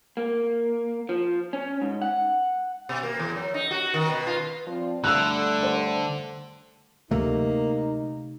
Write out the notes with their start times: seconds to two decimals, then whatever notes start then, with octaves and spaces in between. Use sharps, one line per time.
0.17 A#3
1.09 F3
1.53 C#4
1.82 G#2
2.02 F#5
2.89 B2
3.03 A#3
3.19 E2
3.36 F#3
3.54 D#4
3.71 F#4
3.94 D#3
4.10 B2
4.27 F4
4.67 F3 C4 D5
5.04 D3 G3 A3 E6 F#6
5.63 C5
7.11 D2 C3 F#3 A3 A#3 D#4